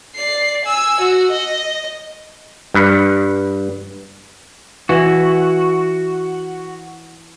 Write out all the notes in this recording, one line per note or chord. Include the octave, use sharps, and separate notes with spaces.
D5 C7
G#5 E6
F#4
D#5
G2 B4
E3 E4 F#4